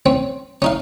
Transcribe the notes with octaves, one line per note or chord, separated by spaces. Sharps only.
C4 C#4
C#4 D#4 F5